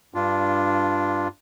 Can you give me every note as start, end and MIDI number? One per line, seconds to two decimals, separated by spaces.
0.14 1.28 43
0.14 1.28 62
0.14 1.28 65